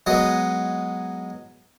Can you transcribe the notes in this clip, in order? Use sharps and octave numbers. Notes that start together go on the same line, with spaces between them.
F#3 G#3 B3 D#5